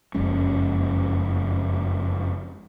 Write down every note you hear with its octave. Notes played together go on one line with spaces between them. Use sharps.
F#1 F2 G#3 C#4